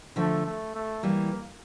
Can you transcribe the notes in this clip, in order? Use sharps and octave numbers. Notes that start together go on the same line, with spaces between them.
D3 F3 A3
A3
A3
E3 G3 A#3